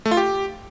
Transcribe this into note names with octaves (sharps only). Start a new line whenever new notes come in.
A3
F4
G4